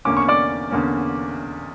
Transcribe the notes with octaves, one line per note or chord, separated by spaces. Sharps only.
E2 D3 A#3 C#4 D6
C#6
D5 D6
E2 D3 A#3 C#4